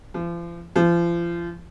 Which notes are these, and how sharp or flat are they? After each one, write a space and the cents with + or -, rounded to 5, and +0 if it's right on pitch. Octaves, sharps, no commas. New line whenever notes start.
F3 -40
F3 -35